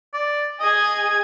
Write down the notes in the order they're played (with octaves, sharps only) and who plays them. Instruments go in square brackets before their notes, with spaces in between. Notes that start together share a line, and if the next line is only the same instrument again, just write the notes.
[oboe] D5
[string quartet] G#4 G#6 [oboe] D#5